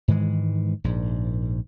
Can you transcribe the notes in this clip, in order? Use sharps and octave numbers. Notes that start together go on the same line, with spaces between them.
G#2 D#3 E3 G#3
A#1 G#2